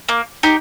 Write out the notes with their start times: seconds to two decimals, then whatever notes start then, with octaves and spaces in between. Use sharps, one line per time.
0.09 A#3
0.43 D#4 G4